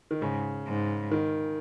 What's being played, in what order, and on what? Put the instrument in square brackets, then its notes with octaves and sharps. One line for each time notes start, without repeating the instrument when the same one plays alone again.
[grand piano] D#3
[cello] G#2 [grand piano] C#3
[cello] G#2
[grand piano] D#3